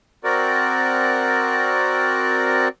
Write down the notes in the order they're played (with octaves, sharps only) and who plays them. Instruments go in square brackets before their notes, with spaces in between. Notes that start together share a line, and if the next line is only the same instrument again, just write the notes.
[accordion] C4 F#4 A#4 D5